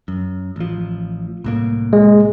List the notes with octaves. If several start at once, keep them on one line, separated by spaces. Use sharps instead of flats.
F#2
A1 F3
C2 A2 A#3
G#3